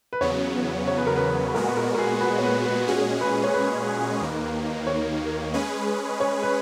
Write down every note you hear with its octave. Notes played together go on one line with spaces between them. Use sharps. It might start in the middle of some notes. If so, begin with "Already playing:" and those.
B4
E2 C#3 F#3 B3 C#5
C#5
B4
A#4
B4
A#2 G#3 B3 F#4 A#4
B4
A#4
A#4
G#4
B4
C#5
B4
B4
A#2 G#3 C#4 F#4 G#4
B4
C#5
B4
D#2 D#3 A#3
C#5
G#3 C#4 G#4 B4
C#5
B4